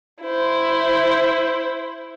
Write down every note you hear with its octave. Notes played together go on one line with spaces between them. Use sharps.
E4 C5